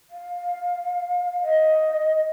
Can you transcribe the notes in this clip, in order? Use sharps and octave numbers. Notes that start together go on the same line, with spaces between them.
F5
D#5